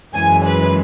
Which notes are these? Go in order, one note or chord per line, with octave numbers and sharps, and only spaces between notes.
F#2 E3 G#3 G#5
B4